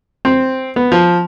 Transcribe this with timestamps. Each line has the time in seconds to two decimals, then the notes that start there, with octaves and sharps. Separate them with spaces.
0.25 C4
0.76 B3
0.92 F3